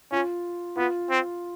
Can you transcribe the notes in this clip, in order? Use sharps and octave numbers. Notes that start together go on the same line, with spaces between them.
C#4 F4
B3 F4
C4